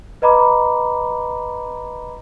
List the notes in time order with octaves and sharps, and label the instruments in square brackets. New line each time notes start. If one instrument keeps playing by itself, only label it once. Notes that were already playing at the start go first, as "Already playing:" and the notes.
[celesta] B4 D#5 A#5 B5 D6